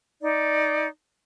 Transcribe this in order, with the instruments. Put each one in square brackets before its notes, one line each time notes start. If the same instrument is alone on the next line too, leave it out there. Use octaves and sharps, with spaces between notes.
[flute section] D#4 D5